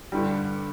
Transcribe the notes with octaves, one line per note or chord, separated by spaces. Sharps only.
G2 D3 G3